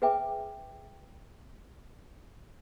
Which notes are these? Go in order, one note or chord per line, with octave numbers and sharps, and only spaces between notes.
G#4 B4 E5 G5 G#5 D6